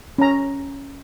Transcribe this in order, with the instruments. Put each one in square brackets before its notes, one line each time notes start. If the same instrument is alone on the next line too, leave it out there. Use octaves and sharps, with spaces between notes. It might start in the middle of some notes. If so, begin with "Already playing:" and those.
[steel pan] C#4 A#5